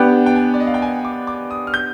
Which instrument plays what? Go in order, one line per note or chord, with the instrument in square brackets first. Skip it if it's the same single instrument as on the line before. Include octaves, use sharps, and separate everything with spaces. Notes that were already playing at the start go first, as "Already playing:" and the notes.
Already playing: [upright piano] B3 D4 G4 [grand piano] G5
[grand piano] G5
G#5
D5
D#5
F5
G5
G#5
D6
D6
D#6
F6
G6